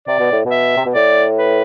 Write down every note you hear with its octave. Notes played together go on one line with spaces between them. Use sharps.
C3 D5
B2
A2
B2
E5
C3
B2
A2 D5
B4